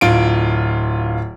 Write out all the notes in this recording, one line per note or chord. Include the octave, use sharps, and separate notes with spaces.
D1 F4 D7